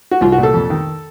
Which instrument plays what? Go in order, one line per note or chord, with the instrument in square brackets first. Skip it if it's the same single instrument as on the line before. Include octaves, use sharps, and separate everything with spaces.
[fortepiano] F#4
C2 F4
F#4
A#2
A4
F2
D#3